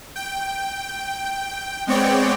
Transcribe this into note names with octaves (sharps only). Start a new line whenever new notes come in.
G5
G#3 B3 C4 C#5 D5 G5